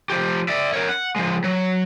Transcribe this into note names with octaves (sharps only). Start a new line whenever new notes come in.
F3 G4
D5 E5
A#4 C#5
F#5
F3 G#3
F#3